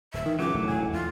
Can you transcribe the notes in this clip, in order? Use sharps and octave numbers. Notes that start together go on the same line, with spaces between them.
D1 E5
D#3 E3
C#2 F#3 D6
E1 A2 D#3 A3
E1 A1 E2 G#5
E2 G#3 F4